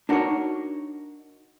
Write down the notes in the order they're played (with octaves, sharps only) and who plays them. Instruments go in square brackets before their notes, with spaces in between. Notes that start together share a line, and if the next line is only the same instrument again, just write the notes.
[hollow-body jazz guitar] D4 D#4 F#4 A#4 C#5